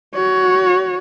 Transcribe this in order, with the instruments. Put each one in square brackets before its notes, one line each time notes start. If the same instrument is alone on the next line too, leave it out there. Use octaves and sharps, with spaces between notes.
[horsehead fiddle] F#4 C#5